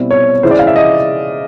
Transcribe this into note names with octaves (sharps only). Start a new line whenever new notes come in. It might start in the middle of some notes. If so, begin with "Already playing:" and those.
Already playing: B2 G3 C4 E4
C#5
C#3 E3 G#3 C#4 E4 C5
D5
F5
E5
D#5